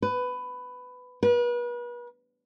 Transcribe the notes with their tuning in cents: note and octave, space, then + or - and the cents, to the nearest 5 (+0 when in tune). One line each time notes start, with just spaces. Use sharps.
B4 +15
B4 -40